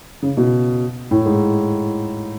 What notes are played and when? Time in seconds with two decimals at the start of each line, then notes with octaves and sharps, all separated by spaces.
0.22 C#3
0.37 B2
1.11 A2
1.26 G#2